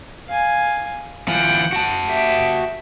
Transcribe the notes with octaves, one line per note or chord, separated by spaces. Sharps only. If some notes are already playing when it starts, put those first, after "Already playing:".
F5 G#5
E3 F4 F#5 G5
F#4 A5
G4 E5